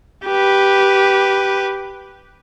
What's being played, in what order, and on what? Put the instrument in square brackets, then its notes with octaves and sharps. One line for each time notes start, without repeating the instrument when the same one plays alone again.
[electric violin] G4 B4